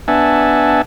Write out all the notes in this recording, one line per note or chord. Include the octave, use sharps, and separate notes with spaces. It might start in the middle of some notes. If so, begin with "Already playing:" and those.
B3 D4 E5 F#5 G#5 A5